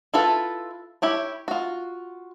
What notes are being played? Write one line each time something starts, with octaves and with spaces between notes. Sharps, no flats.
E4 F4 A4 B4
E4 G4 C#5
F4 F#4